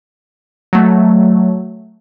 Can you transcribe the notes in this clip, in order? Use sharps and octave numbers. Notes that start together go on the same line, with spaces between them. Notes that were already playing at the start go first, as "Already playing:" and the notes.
F#3 A3